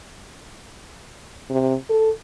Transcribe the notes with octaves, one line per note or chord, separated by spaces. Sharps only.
C3
A4